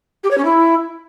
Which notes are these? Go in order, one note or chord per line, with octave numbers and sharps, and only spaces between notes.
G4
C#5
C#4
E4